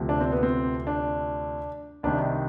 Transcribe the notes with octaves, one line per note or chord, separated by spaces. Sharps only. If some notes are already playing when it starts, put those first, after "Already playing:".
Already playing: D2 C3 F3
D4
C4
B3
C4
D4
C2 C3 D#3 D4